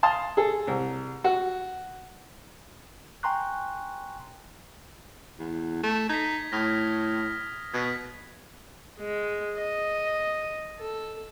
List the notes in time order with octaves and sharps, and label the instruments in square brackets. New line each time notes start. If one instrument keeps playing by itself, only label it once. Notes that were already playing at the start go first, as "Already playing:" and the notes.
[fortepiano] F5 A5 C6 D#6
G#4 A4
C2
F#4
[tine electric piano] G5 G#5 A#5 C6 C#6 F#6
[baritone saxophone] E2
A3
[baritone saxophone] D#4 [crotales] G#6 B6
[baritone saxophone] A2 [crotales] D#6 F6 A#6
[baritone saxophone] B2 [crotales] G#6 B6
[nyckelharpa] G#3
D#5
A4